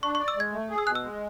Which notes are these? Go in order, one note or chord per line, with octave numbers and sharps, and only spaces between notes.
D4 C#6
C#6
D5
E6
G#3 G#6
A3
G#4
E6
B2 F#6
E6
G#3